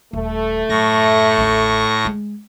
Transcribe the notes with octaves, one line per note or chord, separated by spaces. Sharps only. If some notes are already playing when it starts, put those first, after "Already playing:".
D#1 A3
F#2 A2 C#6 A#6
A1 D#2
G#3